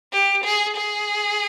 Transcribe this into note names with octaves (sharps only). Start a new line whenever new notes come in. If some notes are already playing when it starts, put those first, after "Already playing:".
G4
G#4
G#4